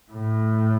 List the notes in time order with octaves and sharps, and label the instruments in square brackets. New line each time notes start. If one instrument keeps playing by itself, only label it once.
[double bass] A2